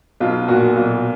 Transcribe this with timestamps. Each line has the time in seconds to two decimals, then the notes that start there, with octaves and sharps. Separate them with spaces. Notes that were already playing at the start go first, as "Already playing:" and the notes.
0.20 B1 F4
0.48 A#2 F#4
0.77 B1 F4